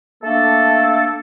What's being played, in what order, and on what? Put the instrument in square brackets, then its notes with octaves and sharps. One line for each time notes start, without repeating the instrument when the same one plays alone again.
[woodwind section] A3 A#3 D4 A4